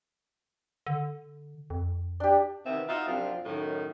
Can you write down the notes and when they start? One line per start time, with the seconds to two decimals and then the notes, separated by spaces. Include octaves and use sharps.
0.86 D3
1.70 F2
2.20 D4 G4
2.65 C3 D#3 E3 B3 C4 E5
2.88 D#4 F4 F#4 D#5 E5
3.07 F#2 C3 F3 C4 D4 F4
3.46 F#2 A2 D#3